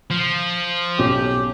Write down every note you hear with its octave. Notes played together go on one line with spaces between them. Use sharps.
F3
B1 C#4 G4